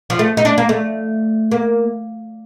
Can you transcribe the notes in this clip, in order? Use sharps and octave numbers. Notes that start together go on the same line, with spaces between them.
F3
A3
D#4
D4
A#3
A3
A#3